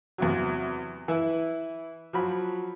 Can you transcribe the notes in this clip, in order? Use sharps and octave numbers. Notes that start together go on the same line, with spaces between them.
E2 C3 F#3
E3 E4
F3 F#3 B5